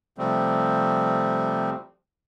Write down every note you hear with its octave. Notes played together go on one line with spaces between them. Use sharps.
C3 F3 G3 A3 C4